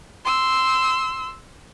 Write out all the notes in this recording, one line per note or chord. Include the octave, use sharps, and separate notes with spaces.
C6 E6